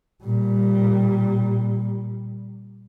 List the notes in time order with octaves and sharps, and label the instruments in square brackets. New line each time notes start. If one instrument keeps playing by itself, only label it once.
[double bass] A#2 G3